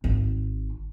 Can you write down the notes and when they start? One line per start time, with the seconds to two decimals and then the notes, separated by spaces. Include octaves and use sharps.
0.04 G#1